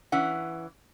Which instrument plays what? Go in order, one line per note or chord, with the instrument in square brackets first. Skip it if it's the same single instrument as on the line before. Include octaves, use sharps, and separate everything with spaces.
[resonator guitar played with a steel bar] E3 C#4 F#5